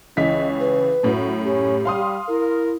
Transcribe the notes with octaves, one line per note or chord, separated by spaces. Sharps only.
C#2 E3 C#4 D#5 B6
B4
F#2 A2 F#4
C#4 G4
G3 F5 C6 D#6
E4 A#4